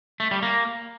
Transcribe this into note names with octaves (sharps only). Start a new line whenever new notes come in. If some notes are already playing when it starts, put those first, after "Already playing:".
A3
G3
A#3